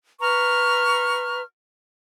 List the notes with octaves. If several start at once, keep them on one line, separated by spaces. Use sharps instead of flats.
B4 A#5 C#6 F6